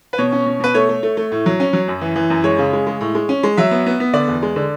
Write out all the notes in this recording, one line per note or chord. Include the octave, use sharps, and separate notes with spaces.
B4
B2 C#5
C#4
B2
B2 B4
A3 C#5
A3
A3
A3
A2
F#3
C#4
F#3
F#2
E3
E3
F#2
G#3 C#5
C#3
G#3
G#3
A2
G#3
C#4
G#3
F#3 E5
B3
B3
B3
D3 D5
E2
G#3
D3